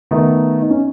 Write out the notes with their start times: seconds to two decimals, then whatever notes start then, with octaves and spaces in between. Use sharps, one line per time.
0.11 D#3 A3 B3 D#4
0.62 D#4
0.70 C#4